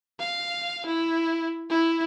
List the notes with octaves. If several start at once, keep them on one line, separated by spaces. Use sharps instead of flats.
F5
E4
E4